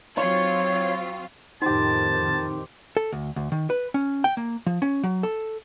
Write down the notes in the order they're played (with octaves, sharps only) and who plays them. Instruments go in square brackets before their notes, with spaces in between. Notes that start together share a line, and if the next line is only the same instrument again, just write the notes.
[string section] F#3 C4 F4 [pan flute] C#5 [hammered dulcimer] C#6
[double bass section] F2 A2 D#3 [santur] C4 G4 [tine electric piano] D#4 [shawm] A5
[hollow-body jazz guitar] A4
D2
D2
D#3
B4
C#4
G5
A#3
F3
C#4
F#3
A4